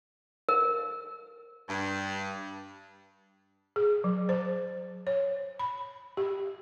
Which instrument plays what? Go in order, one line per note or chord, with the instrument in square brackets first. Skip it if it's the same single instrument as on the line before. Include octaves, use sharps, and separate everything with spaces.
[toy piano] A#4
[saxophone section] G2
[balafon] G#4
F#3
C5
C#5
B5
G4